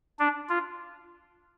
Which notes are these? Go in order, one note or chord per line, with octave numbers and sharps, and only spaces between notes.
D4
F4